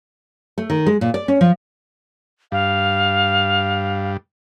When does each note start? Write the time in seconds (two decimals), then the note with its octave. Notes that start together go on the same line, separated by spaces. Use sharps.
0.58 A3
0.70 D#3
0.86 G#3
1.01 A#2
1.14 D5
1.28 C#4
1.41 F3
2.52 G2 F5